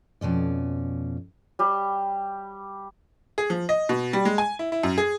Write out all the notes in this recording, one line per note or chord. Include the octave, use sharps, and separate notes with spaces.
F2 B2 C#4 D5
G3 G4
G#4
F3
D#5
B2
G3
G#3
G#5
E4
E4
F#2
G#4